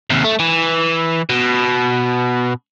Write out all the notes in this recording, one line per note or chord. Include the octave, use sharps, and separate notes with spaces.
D#2 C3
A3
E3
B2